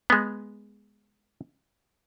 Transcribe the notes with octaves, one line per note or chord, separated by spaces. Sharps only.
G#3 B3